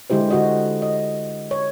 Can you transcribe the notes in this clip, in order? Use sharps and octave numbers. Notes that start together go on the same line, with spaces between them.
D3 G#3 E4 G4 C5
D3 F#4 D#5
D#5
C#5